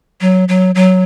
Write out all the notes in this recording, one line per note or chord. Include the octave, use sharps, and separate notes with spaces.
F#3
F#3
F#3